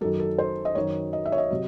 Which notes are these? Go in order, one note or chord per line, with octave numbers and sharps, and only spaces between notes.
F#2 D#3 F#3 A4
A4
C5
D#5
F#2 D#3 F#3 C#5
D#5
E5
C#5
D#5
C3 F#3